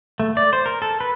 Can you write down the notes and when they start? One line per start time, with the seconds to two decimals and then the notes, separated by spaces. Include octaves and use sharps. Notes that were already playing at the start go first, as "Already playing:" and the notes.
0.20 A3
0.37 D5
0.53 C5
0.66 A#4
0.82 A4
1.01 B4